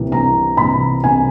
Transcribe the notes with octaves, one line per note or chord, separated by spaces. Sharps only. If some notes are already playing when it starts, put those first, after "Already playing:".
Already playing: C2 C3 E3
C2 A#5
C3 E3 B5
C2 G#5